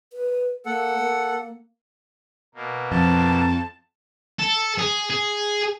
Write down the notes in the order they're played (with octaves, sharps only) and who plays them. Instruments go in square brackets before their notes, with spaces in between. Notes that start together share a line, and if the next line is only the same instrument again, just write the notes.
[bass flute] B4
[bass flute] A#3 [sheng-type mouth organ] A4 F#5
[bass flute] A#3
[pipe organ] B2 A#3
[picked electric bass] F2 [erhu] A5
[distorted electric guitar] A4
G#4
G#4